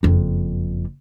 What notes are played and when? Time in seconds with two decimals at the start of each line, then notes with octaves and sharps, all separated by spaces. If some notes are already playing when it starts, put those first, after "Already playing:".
0.03 F#1 F2